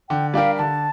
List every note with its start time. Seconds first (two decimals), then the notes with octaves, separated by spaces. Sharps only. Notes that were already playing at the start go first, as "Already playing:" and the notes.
0.09 D3 G5
0.34 G3 D4 G4 A#4 F5
0.58 D3 A5